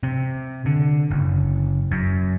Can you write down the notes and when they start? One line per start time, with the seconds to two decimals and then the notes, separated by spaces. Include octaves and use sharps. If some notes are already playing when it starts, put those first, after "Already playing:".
0.03 C3
0.66 D3
1.11 F#1
1.91 F#2